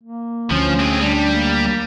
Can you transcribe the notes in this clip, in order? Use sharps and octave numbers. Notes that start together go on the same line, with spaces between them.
A#3
D2 F3 C#4
C4 G#4
G3 D4
A#3